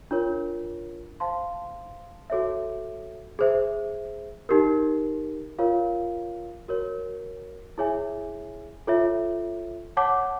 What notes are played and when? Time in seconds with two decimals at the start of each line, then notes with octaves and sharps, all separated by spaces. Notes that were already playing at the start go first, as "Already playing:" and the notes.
0.11 D4 F4 A#4 C#5
1.20 C5 F5 A5 C6
2.30 F#4 A4 C#5 E5
3.39 G#4 C5 E5
4.49 D#4 G4 A#4
5.59 F4 A#4 C#5 F5
6.68 F#4 A#4 C#5
7.78 E4 G#4 C#5 E5 G#5
8.87 F4 A4 C#5 E5
9.97 C#5 F#5 A5 D6